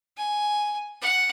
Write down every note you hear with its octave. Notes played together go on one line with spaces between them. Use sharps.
G#5
F#5